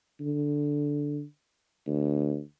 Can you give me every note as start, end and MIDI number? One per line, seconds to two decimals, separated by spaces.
0.20 1.24 50
1.87 2.41 38